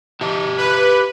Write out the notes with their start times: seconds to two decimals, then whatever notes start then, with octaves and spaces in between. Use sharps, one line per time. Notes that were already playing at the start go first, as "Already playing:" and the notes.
0.21 G4 E5 A5
0.58 B4